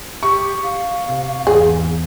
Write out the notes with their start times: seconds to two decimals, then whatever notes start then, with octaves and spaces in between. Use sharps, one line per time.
0.23 G4 C#6
0.64 F5
1.04 C3
1.47 G#1 E2 G#4